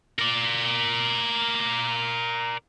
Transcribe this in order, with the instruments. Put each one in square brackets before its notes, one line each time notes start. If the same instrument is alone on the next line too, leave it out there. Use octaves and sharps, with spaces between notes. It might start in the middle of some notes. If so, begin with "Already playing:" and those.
[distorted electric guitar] A#4 D5